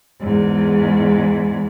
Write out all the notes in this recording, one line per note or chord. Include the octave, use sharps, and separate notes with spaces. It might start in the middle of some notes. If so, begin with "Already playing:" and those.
E2 G#2